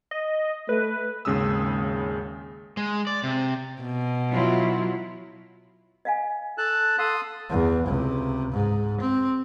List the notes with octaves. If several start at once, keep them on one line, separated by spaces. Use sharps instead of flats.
D#5
A3 B4
G#1 D#2 C#3 G#3 D#6 E6
G#3
D5
C3
B2
F#3 E4 F4
D#5 F5 G#5
A4 A5 F#6
A4 F5 C6 D#6
E2
C#2 C3
G#2
C4